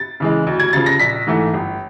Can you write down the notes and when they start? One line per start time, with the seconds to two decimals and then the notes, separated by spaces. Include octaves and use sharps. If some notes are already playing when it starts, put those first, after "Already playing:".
Already playing: A6
0.20 C#3 E3 G#3
0.47 D2
0.60 G#6
0.73 C#3 F3 A6
0.86 A#6
0.99 A#1 B6
1.27 G#2 E3 A3
1.54 G1